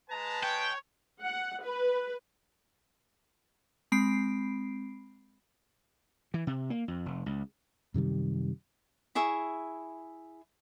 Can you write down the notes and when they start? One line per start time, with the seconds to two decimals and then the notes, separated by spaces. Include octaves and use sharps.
0.10 G#3 B4 A5 A#5
0.43 C#5 G5
1.23 F#5
1.64 B4
3.92 G#3 C4 B5 C7 D7
6.34 E3
6.47 C3
6.70 A#3
6.88 F2
7.06 F1
7.26 C#2
7.94 F#2 C3 D#3 G3
9.15 E4 G#4 E5 C#6